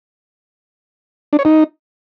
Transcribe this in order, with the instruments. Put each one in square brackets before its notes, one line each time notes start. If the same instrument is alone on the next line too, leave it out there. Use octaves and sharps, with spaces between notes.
[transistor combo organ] D4
C#5
D#4